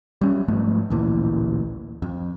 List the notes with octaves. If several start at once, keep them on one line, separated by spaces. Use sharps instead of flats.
G3 C#4
G#2 F3 A3 B3
A1 D2 A#2 E3
F2